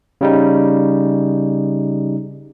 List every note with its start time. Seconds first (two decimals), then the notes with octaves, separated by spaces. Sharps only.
0.21 C#3 G3 D#4